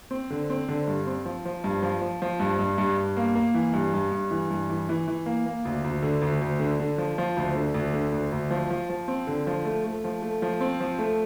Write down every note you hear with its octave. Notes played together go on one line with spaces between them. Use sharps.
C4
D3
C4
D3
G2
C4
F3
F3
G2
F3
F3
F3
G2
G2
G2
G2
A#3
A#3
E3
G2
G2
G2
E3
G2
E3
E3
E3
A#3
A#3
D2
D2
D3
D2
D2
D3
D3
F3
F3
D2
D3
D2
D3
D2
D2
F3
F3
F3
C4
D3
F3
A3
A3
F3
A3
F3
C4
F3
A3